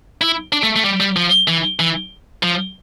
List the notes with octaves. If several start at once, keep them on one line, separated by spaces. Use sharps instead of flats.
E4
D4
A3
A3
G3
G3
F3
E3
E3
F3